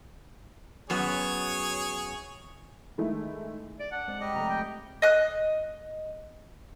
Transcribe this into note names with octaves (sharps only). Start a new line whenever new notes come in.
F#2 F#3 B3 G#4 C#5
D#3 G#3 A3 E4
D5
D4 F#5
G#3 C4 D5
G3 G4 D#5
C3 F3 A3 A#5
G5
D#5 F#6